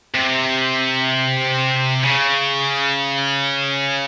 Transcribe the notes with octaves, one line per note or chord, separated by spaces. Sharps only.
C3
C#3